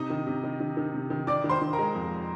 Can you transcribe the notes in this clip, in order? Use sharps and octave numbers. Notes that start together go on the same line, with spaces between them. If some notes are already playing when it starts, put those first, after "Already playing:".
Already playing: C3 D#4 D#5
D#3
C3
D#3
D#3
D#3
C3
D#3
D#3 D5 D6
D#3
C5 C6
D#3
A#4 A#5
G#3
F2